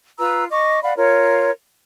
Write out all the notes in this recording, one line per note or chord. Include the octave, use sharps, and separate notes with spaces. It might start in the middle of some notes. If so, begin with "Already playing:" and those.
F4 B4 A#5 E6
D#5 C#6 D6
D5 F5 F#5 B5
F4 A#4 C#5